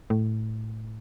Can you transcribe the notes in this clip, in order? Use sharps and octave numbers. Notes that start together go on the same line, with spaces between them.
A2